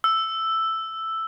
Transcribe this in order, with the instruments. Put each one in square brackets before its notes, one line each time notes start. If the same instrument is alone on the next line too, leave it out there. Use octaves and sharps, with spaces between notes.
[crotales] E6